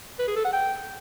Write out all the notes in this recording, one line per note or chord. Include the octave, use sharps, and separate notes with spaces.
B4
G#4
A4
F#5
G5